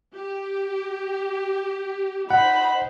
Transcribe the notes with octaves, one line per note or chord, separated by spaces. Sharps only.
G4
D#4 C5 F#5 B5